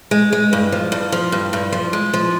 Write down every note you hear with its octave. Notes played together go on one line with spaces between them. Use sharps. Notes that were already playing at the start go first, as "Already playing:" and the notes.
G#3
G#3
G2
F3
G2
F3
G2
G2
F3
G#3
F3